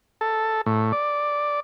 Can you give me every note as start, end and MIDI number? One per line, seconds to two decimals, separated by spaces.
0.21 0.61 69
0.66 0.92 45
0.93 1.60 74